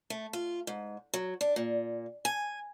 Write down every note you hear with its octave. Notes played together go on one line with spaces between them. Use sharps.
A3
F4
G#2
F#3
D4
A#2
G#5